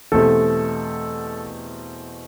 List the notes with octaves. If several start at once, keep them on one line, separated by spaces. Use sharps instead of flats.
E2 B2 A3 C4 G4 A4